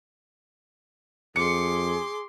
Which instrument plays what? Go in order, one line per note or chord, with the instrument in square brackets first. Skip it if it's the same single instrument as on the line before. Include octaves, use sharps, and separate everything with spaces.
[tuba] F2 [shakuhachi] G#4 [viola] C6 D6 [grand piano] C#7